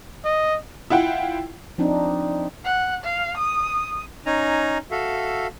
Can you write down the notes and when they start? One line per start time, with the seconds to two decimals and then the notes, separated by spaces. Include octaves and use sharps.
0.25 D#5
0.90 E4 F4 F#5 G5
1.78 F3 C4 D4 D#4
2.64 F#5
3.04 F5
3.37 D#6
4.26 C#4 D#4 G#5 A#5
4.91 F#4 A4 E5 F5